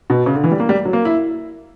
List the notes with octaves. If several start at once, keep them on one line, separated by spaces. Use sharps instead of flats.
B2
C#3
D3
E3
G3
A#3
G3
F#3
A#3
E4